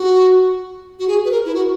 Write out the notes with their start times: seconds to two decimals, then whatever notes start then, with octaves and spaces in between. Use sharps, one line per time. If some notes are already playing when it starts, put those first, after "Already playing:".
Already playing: F#4
0.99 F#4
1.08 G#4
1.25 B4
1.31 A#4
1.45 E4
1.55 F#4